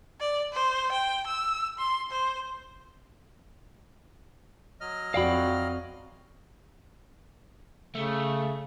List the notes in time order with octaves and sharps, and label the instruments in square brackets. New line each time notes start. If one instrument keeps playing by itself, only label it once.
[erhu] D5
C5
G5
E6
C6
C5
[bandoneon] F#3 D#5 F6
[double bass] F2 C4 [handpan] F#4 D5 [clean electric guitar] F5 G5 B5
[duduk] C#3 [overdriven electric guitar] A3